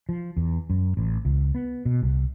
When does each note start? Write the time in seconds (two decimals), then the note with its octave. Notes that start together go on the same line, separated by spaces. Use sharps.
0.09 F3
0.37 E2
0.70 F#2
0.97 A1
1.25 C#2
1.55 B3
1.85 B2
2.02 C2